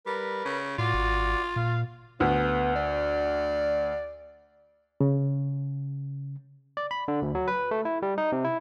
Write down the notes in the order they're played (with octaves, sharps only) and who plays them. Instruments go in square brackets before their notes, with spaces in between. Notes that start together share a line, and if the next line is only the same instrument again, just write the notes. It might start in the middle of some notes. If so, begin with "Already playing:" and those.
[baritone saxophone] G3 [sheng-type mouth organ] A#4 B4
[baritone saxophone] C#3
[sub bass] A2 [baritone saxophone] F4 [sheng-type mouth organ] F#4 D5
[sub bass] G#1
[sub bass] A#2 [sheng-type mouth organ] F5
[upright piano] D2 [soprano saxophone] B3
[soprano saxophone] D5
[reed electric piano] C#3
[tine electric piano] D5
B5
D3
D2
F#3
B4
A3
E4
G3
D#4
C3
E4